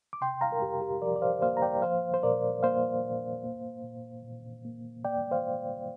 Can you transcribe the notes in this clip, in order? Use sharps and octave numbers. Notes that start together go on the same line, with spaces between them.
D6
C3 G5 C6
F5 A#5
A#4
F2 G4
G4
F3 A#4 D5
D5
C5 F5
A#3 C5 F5
A#5
D5 G5
F3 C5 F5
C5
A#2 A#4 D5
A#3 C5 F5
A#2
A#3
A#2
A#2
A#3
A#3 D5 G5
C5 F5